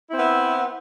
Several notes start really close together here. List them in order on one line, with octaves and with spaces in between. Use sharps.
E4 C4 B3 E5